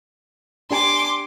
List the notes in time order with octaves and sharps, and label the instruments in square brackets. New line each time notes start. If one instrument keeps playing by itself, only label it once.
[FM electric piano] D4 G4 G#5 [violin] C6 D6